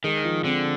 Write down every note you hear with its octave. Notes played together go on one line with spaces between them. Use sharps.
D#3 G#3
F3
D3 C4